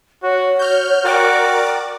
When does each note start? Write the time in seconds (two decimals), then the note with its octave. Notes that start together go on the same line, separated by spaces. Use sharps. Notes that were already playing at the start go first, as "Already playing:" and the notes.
0.23 F#4 C#5
0.59 F#4 F6 G6
1.05 F#4 A#4 D5 G5 D6